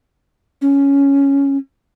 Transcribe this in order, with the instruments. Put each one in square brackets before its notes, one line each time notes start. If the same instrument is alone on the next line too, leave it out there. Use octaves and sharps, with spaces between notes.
[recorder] C#4